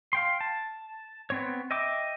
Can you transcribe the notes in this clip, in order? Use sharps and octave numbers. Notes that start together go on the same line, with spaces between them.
F5 G5 C6
A5
B3 C4 C#5
D#5 E5 G5 D6